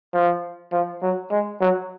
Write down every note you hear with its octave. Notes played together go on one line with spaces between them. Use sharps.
F3
F3
F#3
G#3
F#3